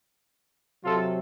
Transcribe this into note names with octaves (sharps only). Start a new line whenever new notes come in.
C3 F#3 F4 A4